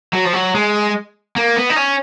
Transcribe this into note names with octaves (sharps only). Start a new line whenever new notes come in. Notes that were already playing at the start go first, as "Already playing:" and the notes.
F#3
F3
F#3
G#3
A#3
B3
D#4
C#4